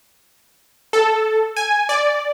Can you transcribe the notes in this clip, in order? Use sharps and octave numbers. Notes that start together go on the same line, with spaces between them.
A4
G#5
D5